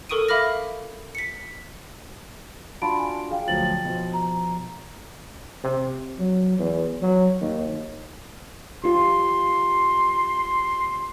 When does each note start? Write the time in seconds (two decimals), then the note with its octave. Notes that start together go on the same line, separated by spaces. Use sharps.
0.09 A4 A#4 C#6 D#6 D7 D#7
0.28 E5 F5 B5 D6 F6 A#6
1.15 B6 C#7
2.82 D4 F4 F#4 A5 B5 D7
2.99 G#5
3.30 G#4 F5 G5
3.48 D2 F3 F#3 G5 A6 F#7
3.85 B2 F3
4.13 A#5
5.64 C3
6.19 F#3
6.59 E2
7.02 F#3
7.41 D#2
8.84 F4 G4 C6